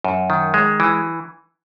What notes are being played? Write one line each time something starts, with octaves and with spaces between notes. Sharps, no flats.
F#2
D#3
G#3
E3